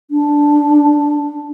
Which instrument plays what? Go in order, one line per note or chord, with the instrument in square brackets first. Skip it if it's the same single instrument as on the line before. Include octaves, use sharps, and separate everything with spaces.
[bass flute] D4